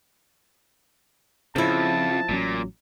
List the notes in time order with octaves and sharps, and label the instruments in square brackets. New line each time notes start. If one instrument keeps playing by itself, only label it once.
[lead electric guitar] F2 [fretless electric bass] C#3 [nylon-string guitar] F3 E4 [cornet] A5
[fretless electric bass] A1 F#3 C#4 [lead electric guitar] A#2